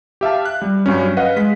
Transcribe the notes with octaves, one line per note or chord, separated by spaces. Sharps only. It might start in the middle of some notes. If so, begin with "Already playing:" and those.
G4 E5 F5 A5
F#6
G3
G2 F#3 C#4
B4 D#5 F5 F#5
G#3 B6